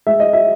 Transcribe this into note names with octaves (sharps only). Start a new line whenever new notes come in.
G#3 E5
D#5
E5